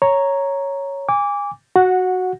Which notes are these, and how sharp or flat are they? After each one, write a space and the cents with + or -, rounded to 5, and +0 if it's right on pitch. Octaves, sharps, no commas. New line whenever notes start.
C#5 +0 A#5 +0
G#5 -30 D6 -20
F#4 +0 F#5 -15